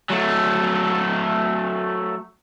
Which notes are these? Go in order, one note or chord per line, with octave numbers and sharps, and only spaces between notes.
F#3 A3